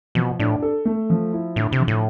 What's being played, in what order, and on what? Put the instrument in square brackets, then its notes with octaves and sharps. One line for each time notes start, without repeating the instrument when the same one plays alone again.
[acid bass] B2 [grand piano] F3
[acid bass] A2 [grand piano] D4
[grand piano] A4
A3
F3
E4
[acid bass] A2 [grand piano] D3
[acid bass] C3
[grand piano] F3
[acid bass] A2